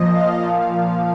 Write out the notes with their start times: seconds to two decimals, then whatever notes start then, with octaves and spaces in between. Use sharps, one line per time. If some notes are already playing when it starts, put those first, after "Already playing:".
Already playing: A#2 F3 D#5
0.15 F5
0.43 A#2 F3